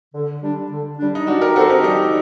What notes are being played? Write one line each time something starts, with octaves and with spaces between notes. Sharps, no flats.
D3
G3 D4
D3
G3 D4
D#4
G3 D4 F#4
G4 A#4
C4 F#4 G4 A4 C5
D#4 G4
G3 D#4 G4